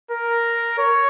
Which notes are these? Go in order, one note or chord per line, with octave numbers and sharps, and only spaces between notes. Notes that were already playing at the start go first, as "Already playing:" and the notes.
A#4
C#5